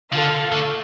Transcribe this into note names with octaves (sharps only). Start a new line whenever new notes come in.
D3 F4 A4 F5
D3 A3